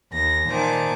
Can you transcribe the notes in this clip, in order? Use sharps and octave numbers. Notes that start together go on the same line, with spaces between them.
D#2 A#6
A#2 D#3 C5 G#5 A5 D6